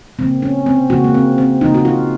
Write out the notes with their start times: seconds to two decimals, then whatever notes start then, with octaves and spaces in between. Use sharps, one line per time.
0.19 C#3 F3 A#3 C4
0.42 C#4
0.66 C4
0.90 C#3 F3 A#3 F#4
1.04 A#3
1.14 C4
1.38 C4
1.61 C#3 F3 A#3 D#4
1.75 F#4
1.85 F4